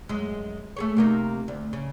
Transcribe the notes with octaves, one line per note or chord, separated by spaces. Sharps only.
F#2 G#3
A3 G#4 C#5
C3 A#3 D#4
D2
C#3